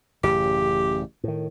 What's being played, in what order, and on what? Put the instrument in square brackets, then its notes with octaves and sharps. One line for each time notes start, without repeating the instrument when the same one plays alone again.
[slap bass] A1 F#2 C#3 [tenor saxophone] G4
[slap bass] A2 D#3